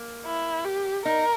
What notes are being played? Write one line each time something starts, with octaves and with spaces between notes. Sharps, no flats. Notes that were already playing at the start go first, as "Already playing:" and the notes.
Already playing: A#3
E4
G4
D#4 A#4